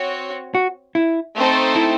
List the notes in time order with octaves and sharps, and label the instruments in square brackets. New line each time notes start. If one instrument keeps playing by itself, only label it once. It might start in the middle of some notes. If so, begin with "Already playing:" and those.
Already playing: [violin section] C4 F#4 C#5
[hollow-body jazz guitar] F#4
E4
[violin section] A3 C4 D#4 A4 C5
[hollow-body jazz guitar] E4